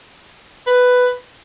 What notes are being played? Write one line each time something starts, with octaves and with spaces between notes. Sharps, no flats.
B4